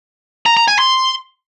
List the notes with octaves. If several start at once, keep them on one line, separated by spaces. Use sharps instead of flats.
A#5
A#5
G#5
C6